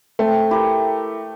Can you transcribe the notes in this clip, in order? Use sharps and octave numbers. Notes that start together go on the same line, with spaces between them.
A3 C4
E4 G4 A#4